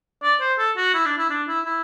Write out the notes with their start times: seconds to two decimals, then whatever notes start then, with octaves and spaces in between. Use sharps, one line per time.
0.23 D5
0.41 C5
0.59 A4
0.77 F#4
0.94 E4
1.06 D4
1.18 E4
1.30 D4
1.48 E4
1.66 E4